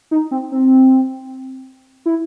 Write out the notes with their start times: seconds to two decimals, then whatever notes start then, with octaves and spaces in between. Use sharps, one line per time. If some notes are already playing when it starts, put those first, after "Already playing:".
0.11 D#4
0.31 C4
0.52 C4
2.06 E4